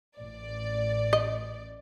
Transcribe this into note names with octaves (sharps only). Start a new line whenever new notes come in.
A1 D5
D#5